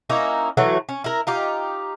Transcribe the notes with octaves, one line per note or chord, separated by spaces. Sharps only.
A#3 C#4 D#4 E4
E3 F#3 A3
C#4
E4 A#4
D#4 F4 G4